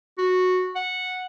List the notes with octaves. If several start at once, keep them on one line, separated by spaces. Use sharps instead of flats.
F#4
F#5